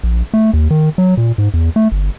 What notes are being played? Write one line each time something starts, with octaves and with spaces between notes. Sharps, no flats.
A#1
A3
D#2
D#3
F#3
A#2
G#2
E2
A3
G1